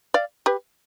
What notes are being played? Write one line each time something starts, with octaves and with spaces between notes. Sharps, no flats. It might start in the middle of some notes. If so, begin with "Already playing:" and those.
D5 F5
G4 B4